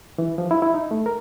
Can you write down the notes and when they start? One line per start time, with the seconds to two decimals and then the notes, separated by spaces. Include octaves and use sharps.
0.18 E3
0.38 F3
0.51 E4
0.62 E4
0.74 D#4
0.91 A3
1.06 A#4